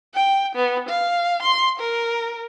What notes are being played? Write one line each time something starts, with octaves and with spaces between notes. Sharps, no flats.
G5
B3
F5
C6
A#4